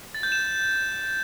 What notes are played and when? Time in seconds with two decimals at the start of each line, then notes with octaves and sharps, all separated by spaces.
0.15 A6
0.23 G6
0.32 E7